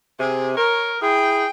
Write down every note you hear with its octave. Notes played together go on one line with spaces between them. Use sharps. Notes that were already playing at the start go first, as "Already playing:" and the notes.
C3 G#4
A#4 C#5
E4 G#4 G5